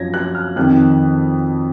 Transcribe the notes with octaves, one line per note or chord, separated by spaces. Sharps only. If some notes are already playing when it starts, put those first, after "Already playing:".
Already playing: F#2 F3 G#6 A#6
F#6
F6
F2 D#3 F#6